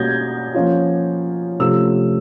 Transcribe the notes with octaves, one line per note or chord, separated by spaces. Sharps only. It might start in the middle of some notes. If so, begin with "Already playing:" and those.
Already playing: B2 G3 A#3 C#4 G6 G#6 A#6
F3 A#3 C#4 F4
C3 F3 A3 C#4 F4 E6